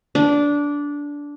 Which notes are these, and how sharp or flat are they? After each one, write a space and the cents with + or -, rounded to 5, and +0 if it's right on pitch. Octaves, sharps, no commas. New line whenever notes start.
D4 -15